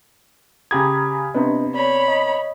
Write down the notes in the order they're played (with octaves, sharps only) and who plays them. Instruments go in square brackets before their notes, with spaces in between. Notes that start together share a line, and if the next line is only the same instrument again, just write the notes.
[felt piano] C#3 G4 G#6 [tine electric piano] A#5 B5 D#6
[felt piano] C3 B3 [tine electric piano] D4 B4 D#5
[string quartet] C#5 B5 [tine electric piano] D5
[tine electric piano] D#5